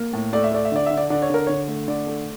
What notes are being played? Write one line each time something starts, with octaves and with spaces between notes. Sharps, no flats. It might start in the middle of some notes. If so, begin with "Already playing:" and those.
Already playing: A#3
A2
A3 D5
E5
A3 D5
E5
D3 D5
D3 E5
D5
D3 D5
C#5
D3 A#4
D3 C#5
A3
D3 D5
A3